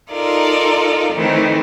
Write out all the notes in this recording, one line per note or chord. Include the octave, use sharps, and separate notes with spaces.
D#4 F4 A4 A#4 D5
D#3 E3 A3 C4